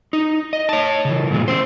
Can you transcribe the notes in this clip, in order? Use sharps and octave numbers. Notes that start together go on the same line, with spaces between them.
D#4
D#5
C#5 A5
C#3 E3
G2 A#2 G#3
C#4 C5